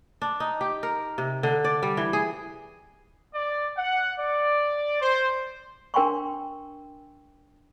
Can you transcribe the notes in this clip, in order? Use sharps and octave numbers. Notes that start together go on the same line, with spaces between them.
D4
D#4
G4
A#4
C3
D3
D5
G3
E3
G#4
D5
F#5
D5
C5
D4 A#4 G5 G#5 C6 C#6